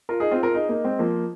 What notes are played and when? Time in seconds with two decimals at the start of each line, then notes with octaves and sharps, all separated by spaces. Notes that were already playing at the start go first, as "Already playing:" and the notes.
0.09 F4 A#4
0.20 D#4 G#4
0.31 C4 F4
0.43 F4 A#4
0.54 D#4 G#4
0.69 A#3 D#4
0.84 G#3 C4
0.99 F3 A#3